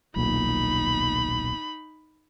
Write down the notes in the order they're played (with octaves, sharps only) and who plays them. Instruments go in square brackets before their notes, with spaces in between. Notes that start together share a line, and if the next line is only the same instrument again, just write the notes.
[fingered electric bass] D#1 B1 A#2 [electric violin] D#4 B5